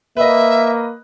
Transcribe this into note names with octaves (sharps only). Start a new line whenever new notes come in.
A#3 B4 D#5 E5